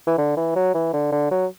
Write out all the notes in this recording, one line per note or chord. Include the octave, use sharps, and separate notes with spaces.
E3
D3
E3
F#3
E3
D3
D3
F#3